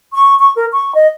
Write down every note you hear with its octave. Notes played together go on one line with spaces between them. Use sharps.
C#6
C#6
A#4
C#6
D#5